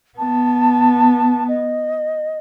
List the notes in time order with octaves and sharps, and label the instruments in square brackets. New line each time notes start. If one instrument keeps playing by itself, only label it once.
[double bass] B3 [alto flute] A5
[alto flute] D#5